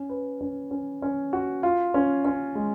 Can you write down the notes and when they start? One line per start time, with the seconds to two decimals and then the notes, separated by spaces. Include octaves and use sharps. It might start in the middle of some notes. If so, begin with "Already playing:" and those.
Already playing: C#4
0.09 B4
0.41 C#4
0.71 C#4
1.02 C#4
1.33 F#4
1.63 F4
1.94 C#4
2.25 C#4
2.55 G#3